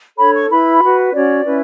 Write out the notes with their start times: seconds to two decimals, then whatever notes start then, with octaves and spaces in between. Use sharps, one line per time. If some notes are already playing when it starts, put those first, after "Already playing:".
0.18 D4 A4 C#5 B5
0.35 C#6
0.50 E4 B4 B5
0.82 F#4 B4
1.13 C#4 F#4 C#5 D5
1.45 C#4 E4 B4